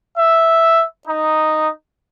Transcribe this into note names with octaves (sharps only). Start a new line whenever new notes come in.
E5
D#4